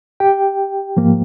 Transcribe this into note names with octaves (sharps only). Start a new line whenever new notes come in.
G4 G5
G#2 F3 A#3